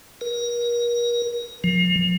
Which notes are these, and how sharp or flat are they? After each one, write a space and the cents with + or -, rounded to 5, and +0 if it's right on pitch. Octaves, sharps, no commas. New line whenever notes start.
A#4 +35
F3 +35